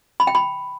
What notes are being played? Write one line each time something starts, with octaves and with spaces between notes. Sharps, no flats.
B5
G5
B5